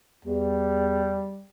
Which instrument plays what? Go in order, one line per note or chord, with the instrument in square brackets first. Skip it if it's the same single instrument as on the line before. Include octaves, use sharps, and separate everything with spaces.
[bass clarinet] E2 [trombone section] G3